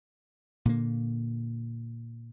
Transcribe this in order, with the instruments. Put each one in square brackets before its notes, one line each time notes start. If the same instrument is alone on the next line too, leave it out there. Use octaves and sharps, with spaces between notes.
[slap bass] A#2 D3 A#3